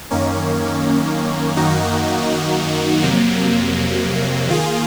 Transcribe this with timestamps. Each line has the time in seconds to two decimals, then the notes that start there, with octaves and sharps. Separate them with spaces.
0.10 F#2 D#3 A#3 C#4
1.56 F#2 D#3 A#3 D#4 F#4
3.02 F2 C3 F#3 A#3
4.49 D#3 A#3 F4 G#4